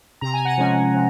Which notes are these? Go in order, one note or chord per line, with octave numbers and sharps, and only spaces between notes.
C3 A#5
G#5
F#5
F3 G#3 C#4 G#5
C3